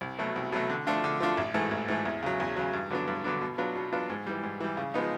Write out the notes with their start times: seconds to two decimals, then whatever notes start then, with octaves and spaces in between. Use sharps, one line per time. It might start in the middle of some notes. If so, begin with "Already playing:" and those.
0.01 C2
0.19 B2 F#3 A3
0.36 C2
0.52 B2 F#3 A3
0.70 D3
0.87 F3 A3 D4 F4
1.04 D3
1.20 F3 A3 D4 F4
1.37 A1
1.54 G#2 E3 A3
1.71 A1
1.88 G#2 E3 A3
2.05 E2
2.22 C#3 F#3
2.40 E2
2.56 C#3 F#3
2.73 G2
2.90 D3 F#3 B3 D4
3.08 G2
3.24 D3 F#3 B3 D4
3.41 B2
3.58 F#3 B3 D4 F4
3.76 B2
3.93 F#3 B3 D4 F4
4.10 G#2
4.27 E3 G3
4.43 G#2
4.60 E3 G3
4.77 C#3
4.94 F3 G#3 B3 D#4